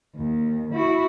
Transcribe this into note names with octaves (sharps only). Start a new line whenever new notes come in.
D#2
E4 F#4